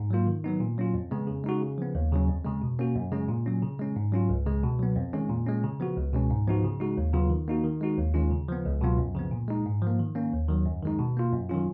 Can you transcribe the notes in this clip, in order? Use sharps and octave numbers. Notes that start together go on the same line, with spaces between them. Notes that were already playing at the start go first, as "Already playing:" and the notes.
Already playing: G#2
F#3 A#3 F4
D#3
F#3 B3 D#4
A#2
F#3 C#4 F4
F2
C#3 G#3 B3
C#3
G#3 D#4 F#4
C#3
F3 B3
D#2
C#3 F#3 C#4
F2
C#3 G#3
B2
A#3 C#4 F#4
F#2
C#3 G#3 C#4
A#2
F#3 C#4
C#3
G#3 C#4
G#2
F#3 C#4 F4
C#2
C#3 G#3
B2
F#3 B3
F2
D#3 G#3 C#4
A#2
G#3 C#4
C#3
F3 B3 F#4
C#2
B2 G#3 C#4
G#2
F3 B3 D#4 F#4
C#3
G#3 D#4 F#4
D#2
C#3 F#3 B3 F4
D#3
A#3 D#4 F#4
D#3
G#3 D#4 F#4
D#2
D#3 G#3 C#4 F4
C#3
F3 B3
C#2
B2 F#3 B3 F4
F#2
C#3 F3 B3
A#2
G#3 D#4
G#2
F3 A#3
D#3
A#3 C#4
D#2
D#3 F#3
F#2
D#3 G#3 D#4
B2
A#3 F4
F#2
D#3 F#3 C#4 F4